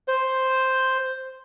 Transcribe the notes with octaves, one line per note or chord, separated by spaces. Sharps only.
C5